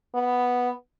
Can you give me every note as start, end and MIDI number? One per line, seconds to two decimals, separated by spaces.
0.14 0.70 59